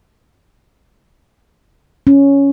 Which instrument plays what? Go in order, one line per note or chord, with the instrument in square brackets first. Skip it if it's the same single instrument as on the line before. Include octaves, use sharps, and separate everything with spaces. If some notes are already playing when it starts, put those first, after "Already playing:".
[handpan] C#4